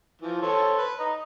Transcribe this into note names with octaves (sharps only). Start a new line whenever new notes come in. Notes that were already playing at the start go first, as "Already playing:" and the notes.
E3 F3
A4 C5 C#5
B4
D#5 A#5